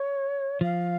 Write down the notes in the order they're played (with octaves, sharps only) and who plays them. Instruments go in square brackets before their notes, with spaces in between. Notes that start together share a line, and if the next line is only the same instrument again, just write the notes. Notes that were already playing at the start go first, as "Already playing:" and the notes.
Already playing: [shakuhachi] C#5
[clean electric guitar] F3 [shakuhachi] F5